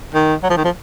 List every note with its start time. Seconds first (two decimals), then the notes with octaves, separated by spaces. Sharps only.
0.14 D#3
0.43 F#3
0.50 F3
0.57 D#3
0.64 F3